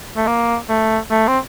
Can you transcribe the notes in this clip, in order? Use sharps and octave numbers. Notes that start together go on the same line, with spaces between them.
A3
A#3
A3
A3
C4